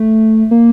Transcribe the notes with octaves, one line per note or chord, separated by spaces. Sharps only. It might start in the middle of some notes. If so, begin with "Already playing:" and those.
Already playing: A3
A#3